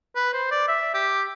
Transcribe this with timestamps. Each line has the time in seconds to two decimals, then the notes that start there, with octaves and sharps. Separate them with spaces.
0.16 B4
0.33 C5
0.51 D5
0.68 E5
0.94 G4